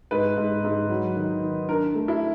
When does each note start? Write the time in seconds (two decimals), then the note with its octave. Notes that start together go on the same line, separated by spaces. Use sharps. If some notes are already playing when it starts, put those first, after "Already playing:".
0.11 G#2 B4
0.37 G#2
0.64 G#2
0.89 F#3
1.17 D#3
1.43 D#4
1.68 D4 A#4
1.95 A3
2.08 E4